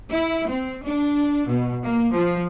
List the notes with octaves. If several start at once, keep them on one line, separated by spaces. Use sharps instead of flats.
E4
C4
D4
B2
A#3
F3